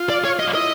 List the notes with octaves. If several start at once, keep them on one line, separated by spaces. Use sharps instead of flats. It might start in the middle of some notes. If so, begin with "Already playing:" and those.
Already playing: F4
D5
C#5
D#5
F4
E4 D#5